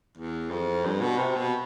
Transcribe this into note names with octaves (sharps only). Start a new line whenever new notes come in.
E2
F2
G2
B2
C3
B2